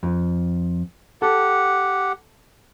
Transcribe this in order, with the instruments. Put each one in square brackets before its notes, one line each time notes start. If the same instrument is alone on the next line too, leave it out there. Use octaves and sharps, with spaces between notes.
[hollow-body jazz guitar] F2
[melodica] G4 F#5 [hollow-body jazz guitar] A4